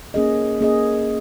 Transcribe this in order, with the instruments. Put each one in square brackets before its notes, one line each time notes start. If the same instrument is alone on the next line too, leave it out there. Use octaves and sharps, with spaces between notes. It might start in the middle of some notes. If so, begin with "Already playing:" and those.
[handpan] A#3 C#4 G#4 D#5
A#3 C#4 G#4 D#5